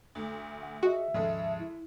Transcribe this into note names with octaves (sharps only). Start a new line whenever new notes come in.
D2 A3
F#5
F#4 G#4 D#5 E5
D#2 G#2 C#3 F3 G#3 A4
E4